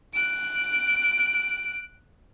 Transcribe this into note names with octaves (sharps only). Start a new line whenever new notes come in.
F#6 D7